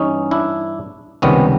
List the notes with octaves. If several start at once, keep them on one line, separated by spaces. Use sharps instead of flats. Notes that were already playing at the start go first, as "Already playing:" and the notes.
Already playing: G2 E3 G3 C#4 D#4
D4 E4
C#2 C3 D#3 G3 B3 C#4